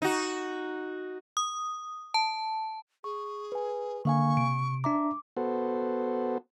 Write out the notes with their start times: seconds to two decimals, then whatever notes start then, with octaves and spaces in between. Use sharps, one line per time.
0.02 D#4 F#4
1.37 D#6
2.14 A5
3.04 G#4 C#6
3.52 B4 G#5
4.05 D3 A#3 F5 G#5 C#6
4.37 C3 D7
4.84 D4 E5 A#5 D6
5.37 B3 F#4 A4 C5